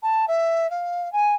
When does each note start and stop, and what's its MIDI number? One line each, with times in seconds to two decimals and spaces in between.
0.02 0.25 81
0.28 0.70 76
0.70 1.11 77
1.12 1.35 80